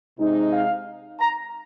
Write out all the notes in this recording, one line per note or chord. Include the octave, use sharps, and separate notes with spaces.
C3 G#3 C4 D#4
F5
A#5